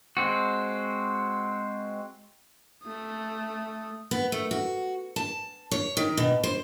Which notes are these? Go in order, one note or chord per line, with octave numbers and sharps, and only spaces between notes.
G#3 C4 F#4
A3 D#6
B3
A3
F#4
A5
C#5
D#3
B2
C5